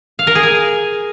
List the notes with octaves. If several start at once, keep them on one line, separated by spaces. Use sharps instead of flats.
F5
A#4
G#4
G#5